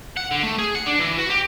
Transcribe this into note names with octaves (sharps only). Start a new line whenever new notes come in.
F#5
D3
A3
G#4
F#5
D4
E3
F#4
G4